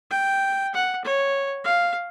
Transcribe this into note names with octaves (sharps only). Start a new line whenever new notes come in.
G5
F#5
C#5
F5